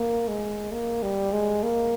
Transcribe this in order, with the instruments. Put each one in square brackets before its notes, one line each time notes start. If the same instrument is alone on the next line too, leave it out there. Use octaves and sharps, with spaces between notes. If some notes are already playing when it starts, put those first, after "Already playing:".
Already playing: [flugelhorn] A#3
G#3
A#3
G3
G#3
A#3